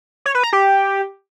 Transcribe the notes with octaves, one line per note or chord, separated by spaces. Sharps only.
C#5
B4
A#5
G4